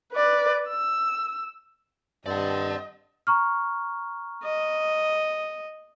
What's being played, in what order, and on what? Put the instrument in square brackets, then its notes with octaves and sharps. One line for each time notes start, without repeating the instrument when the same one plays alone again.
[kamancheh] B4 D5
E6
[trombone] G2 [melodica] C4 A5 [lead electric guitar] D5 F#5 [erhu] D#5
[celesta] A#5 C#6 F6
[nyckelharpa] D#5